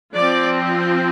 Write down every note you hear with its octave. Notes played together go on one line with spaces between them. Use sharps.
F3 D5
C4